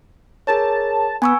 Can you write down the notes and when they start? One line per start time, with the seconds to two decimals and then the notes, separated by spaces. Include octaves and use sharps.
0.47 G#4 A#4 C#5 A5
1.22 B3 G#5 C#6 E6